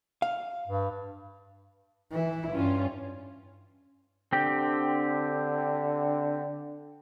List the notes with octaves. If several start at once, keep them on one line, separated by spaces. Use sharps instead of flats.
F5
G2
E3 E4
G2 C#4 F4
D3 C4 G4